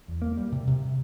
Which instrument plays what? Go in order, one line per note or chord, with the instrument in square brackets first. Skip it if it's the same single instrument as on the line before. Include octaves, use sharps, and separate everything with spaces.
[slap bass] E2
A#3
G3
C3
C3